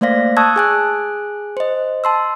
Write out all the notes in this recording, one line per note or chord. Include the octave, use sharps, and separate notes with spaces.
A3 A#3 C5 D5 F5 A#6
A5 C#6 D#6 E6 F#6 G#6
G#4 G#5 F#6
C5 D#5
A5 C6 E6